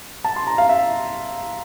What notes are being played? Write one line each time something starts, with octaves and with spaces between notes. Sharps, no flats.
A5
C6
A#5
F5
E5